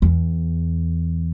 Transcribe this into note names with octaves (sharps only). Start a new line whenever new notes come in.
E2